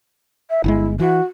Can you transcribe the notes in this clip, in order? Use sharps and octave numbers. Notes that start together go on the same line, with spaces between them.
E5
G1 C#3 G#3 E4
E3 F#4